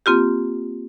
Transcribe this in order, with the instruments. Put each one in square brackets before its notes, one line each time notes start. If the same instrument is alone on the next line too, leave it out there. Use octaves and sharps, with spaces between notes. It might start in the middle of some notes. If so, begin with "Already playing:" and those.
[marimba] A#3 C4 F4 G4